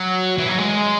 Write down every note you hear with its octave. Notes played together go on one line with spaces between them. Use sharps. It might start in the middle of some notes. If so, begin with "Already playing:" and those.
Already playing: F#3
E3
F#3
G#3